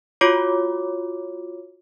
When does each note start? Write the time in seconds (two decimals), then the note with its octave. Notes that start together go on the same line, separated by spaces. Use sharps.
0.21 F4 F#4 C#5 D6